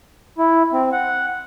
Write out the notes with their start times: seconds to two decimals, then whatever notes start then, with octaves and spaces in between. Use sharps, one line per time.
0.38 E4
0.73 C4
0.92 F#5